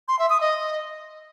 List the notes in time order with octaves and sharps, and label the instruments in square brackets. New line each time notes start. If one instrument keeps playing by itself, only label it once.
[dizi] C6
E5
D#6
D#5